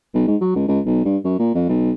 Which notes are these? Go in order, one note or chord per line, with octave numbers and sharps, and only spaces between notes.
B1
G#2
F#3
C#2
C#2
B1
G2
F#2
A#2
F2
B1